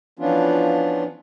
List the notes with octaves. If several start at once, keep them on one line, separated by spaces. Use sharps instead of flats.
E3 F3 B3 C#4 D4 F4